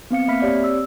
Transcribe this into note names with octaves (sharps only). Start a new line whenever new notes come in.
B3 C4 F5 C#7
A#3 E5 B5 F6 B6
C4 G4 C#5 D5
E6